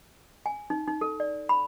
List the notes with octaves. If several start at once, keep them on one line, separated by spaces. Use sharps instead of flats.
G#5
D#4
D#4
A4
D5
B5